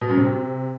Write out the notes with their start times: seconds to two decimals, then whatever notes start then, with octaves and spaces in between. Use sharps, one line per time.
0.01 B2
0.09 F#2
0.17 C3